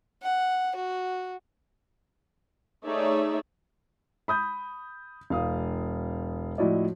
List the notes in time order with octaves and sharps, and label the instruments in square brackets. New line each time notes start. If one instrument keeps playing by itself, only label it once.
[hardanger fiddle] F#5
F#4
[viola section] A3 D#4 G#4 C#5 D5 E5
[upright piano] B5 D#6 G6
E1 F5 D#6
A2 F3 E4 F#4 D5 D#5